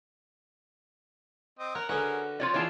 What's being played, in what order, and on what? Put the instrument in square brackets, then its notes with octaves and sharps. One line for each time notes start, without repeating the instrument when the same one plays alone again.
[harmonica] C4 D#5
[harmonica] A#4 [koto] C#5 F#5
[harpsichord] D3 C#4 B4 [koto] F#4 [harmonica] G#4 A#4
[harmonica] F3 [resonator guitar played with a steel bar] F4 C#5 D5
[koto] E3 F4 G#4 [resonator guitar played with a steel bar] C#5 D5 A5